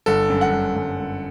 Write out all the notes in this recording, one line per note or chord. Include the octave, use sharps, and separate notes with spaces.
G1 A4
F#2
F#5
G1
G1
G1